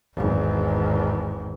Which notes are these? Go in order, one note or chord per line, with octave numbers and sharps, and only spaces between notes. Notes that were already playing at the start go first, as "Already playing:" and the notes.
G#1 E2